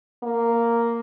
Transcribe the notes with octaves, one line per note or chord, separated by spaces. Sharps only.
A#3